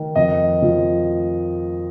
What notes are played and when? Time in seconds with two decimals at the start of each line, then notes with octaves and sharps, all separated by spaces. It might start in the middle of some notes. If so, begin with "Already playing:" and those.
Already playing: D#3
0.15 F2 D#5
0.62 F3